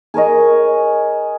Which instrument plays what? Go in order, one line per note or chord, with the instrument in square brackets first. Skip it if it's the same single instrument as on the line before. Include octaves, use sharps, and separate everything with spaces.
[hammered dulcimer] G#4 A#4 C#5 D#5